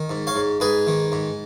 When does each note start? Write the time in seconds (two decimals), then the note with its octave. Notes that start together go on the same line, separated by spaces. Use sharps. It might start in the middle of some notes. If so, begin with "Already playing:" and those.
Already playing: D#3
0.10 G#2
0.27 C#5 F5
0.35 G#2
0.60 G#2 G#4 B4
0.87 D#3
1.12 G#2